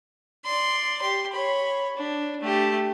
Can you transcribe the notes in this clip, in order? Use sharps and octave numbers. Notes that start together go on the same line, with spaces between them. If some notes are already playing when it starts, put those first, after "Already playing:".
D5 C6
G4 C6
C#5 B5
D4
A3 G4